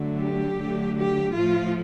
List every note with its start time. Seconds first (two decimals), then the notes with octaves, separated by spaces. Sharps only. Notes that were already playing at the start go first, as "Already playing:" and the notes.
Already playing: D3 F#3 A3
0.19 G4
0.57 D3 F#3 A3
0.95 G4
1.33 A2 F3 A3 F4